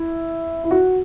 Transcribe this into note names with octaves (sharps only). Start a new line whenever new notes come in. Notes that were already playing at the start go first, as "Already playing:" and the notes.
Already playing: E4
E4
F#4